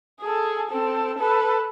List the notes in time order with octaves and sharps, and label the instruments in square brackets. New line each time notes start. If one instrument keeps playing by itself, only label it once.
[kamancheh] G#4 A4
C4 A4
A4 B4